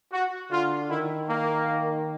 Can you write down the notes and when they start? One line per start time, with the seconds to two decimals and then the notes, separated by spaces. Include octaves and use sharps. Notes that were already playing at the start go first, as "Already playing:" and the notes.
0.13 F#4
0.51 D3 F4
0.90 D#3 E4
1.29 A#3